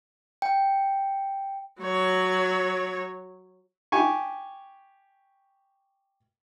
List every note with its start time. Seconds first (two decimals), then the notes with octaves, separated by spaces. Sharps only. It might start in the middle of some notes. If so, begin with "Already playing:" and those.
0.42 G5
1.82 F#3 C#5
3.92 G4 G#5 C#6